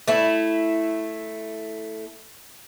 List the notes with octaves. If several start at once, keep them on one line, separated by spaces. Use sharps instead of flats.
A3 E4